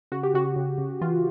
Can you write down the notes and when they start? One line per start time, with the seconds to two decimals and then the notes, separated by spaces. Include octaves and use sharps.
0.12 C#3 F#4
0.23 G4
0.34 C#3 F#4
0.56 C#3
0.78 C#3
1.01 E3 F4